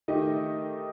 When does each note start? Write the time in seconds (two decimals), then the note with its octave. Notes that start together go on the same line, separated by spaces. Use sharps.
0.08 D#3 A3 D#4 G4 D#5